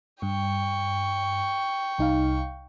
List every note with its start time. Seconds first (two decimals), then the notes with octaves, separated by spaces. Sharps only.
0.22 G2 G5 C#6
1.98 C2 D#4 F5